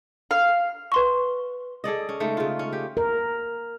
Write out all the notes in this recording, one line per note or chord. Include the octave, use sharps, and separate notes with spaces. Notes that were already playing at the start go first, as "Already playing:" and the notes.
F5
B4 C6 C#6
G#4 A4 D5 D#5
C#4
C#3 G#3 A3 D#4
C#3 F4
C#4
G4
A#4